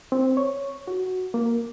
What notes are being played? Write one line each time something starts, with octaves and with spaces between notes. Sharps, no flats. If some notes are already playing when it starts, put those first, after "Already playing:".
C4
C#5
F#4
A#3